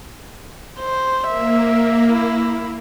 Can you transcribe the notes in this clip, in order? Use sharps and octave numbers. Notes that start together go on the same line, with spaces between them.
C5
A#3 E5
E4